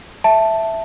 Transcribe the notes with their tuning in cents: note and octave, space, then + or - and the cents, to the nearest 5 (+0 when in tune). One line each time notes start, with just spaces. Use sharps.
E5 +0 A5 +0